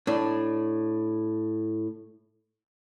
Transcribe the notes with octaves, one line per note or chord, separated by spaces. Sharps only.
A2 D4